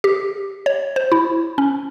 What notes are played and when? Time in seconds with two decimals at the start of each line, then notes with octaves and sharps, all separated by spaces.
0.04 G4
0.66 C#5
0.96 C5
1.12 E4
1.58 C#4